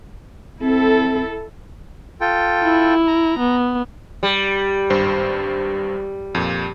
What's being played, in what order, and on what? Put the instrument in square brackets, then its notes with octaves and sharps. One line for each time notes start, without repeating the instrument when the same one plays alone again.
[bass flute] C4 [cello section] E4 A4
[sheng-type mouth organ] F4 A4 G5
[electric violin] E4
[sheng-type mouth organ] A#5
[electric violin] B3
[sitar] G3
[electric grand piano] G#1 G2 C5
F2 A#2